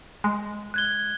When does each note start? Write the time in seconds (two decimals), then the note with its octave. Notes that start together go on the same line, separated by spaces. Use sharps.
0.24 G#3
0.74 F#6 G#6 G7